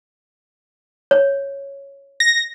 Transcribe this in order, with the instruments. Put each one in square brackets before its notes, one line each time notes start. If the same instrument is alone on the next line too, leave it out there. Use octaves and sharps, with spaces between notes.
[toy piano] C#5
[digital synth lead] A#6